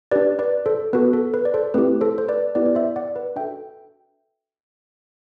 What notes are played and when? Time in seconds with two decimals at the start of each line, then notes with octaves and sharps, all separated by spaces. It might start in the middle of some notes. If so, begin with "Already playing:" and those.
0.11 D4 G4 B4 D5
0.39 B4 D5
0.66 A4 C5
0.93 B3 F#4 A4 B4
1.13 A4
1.34 B4
1.45 D5
1.54 A4 C5
1.74 A3 C4 E4 G4 B4
2.01 A4 C5
2.18 C5
2.28 B4 D5
2.55 B3 E4 G4 B4 D5
2.66 D5
2.75 C5 E5
2.96 D5 F#5
3.16 B4
3.36 D4 F#4 A4 E5 G5